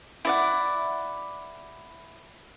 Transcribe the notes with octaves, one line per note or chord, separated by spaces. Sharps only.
E4 D5 F#5